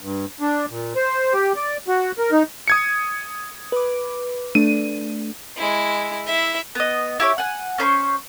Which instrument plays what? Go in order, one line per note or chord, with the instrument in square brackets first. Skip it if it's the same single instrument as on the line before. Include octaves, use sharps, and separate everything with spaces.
[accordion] G2
D4
A#2
C5
G4
D5
F#4
A#4
D#4
[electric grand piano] D#6 G#6 C#7
[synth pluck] B4 D6
[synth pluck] A3 D4 [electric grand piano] D#7
[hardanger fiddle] G#3 E4
E4 E5
[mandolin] B3 D#5
E4 G4 C#5
F#5 G#5
C#4 C5 B5 C#6